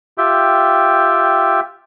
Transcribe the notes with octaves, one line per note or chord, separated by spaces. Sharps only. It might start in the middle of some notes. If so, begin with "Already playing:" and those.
F4 G4 E5 G5